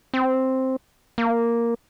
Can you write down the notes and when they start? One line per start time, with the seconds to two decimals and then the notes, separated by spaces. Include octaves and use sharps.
0.14 C4
1.18 A#3